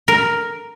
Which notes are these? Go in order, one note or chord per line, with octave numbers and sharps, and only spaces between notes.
A#4